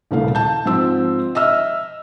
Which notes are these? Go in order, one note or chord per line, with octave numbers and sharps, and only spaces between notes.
D#1 C2 C#3 A3 F5
A5 G6
G#2 F3 C4 E6
D#5 E5 E6 F6